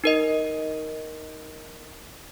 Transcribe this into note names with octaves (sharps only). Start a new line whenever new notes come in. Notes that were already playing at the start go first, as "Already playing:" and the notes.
D#4 A#4 D#5